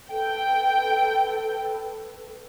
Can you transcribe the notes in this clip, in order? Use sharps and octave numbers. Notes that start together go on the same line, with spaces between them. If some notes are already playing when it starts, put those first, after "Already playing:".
A4 B4 G5